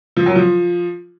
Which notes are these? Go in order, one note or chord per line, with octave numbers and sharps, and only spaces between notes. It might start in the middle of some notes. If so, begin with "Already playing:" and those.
F3
F#3
F3